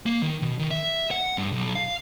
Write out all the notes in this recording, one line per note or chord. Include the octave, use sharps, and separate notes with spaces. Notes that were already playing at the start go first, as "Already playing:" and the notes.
A#3
D#3
B2
D#3
E5
F#5
G2
B1
F5